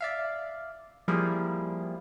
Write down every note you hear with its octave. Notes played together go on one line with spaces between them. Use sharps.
D5 E5 F5
F3 G3 A#3 E4 G#4